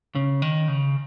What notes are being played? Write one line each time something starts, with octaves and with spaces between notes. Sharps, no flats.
C#3
D#3
C#3